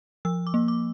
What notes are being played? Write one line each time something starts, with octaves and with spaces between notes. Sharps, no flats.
F3 E6
D6
A#3
D6